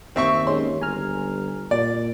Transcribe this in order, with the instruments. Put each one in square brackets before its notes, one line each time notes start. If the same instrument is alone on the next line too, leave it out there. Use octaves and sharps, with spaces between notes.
[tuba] D#2 [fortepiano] C4 E5 C#6
[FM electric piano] D#3 G#3 C#4 [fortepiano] C6
[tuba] G1 [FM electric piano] G#5 A#5 F6
[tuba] A#2 [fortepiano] D5